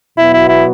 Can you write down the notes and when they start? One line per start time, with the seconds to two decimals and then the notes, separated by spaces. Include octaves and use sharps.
0.18 B2 F#3 B3 E4 F#4
0.33 E4
0.48 E4